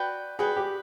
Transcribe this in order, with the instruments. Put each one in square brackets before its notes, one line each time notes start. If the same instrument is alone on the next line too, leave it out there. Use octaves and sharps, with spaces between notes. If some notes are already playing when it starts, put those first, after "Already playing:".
Already playing: [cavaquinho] F#4 B4 D5 G5
[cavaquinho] F#4 B4 D5 G5 [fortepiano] G#4
[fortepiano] G4